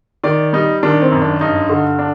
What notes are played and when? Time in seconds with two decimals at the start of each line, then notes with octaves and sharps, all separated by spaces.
0.24 D#3 D5
0.53 G3 D#4
0.83 D#3 D4
1.02 C4
1.12 F#2
1.22 D4
1.41 G2 D#4
1.69 D3
1.99 D4